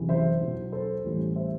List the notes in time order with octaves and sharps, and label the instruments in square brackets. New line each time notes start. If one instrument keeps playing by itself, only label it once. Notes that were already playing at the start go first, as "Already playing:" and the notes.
Already playing: [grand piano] F#1 E2 C3 E3
C5 E5
B1 B2 F#3
A4 C5
A1 A2 E3 G3
C5 E5